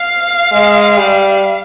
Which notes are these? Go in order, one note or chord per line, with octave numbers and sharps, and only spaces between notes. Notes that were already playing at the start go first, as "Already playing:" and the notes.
Already playing: F5
G#3
G3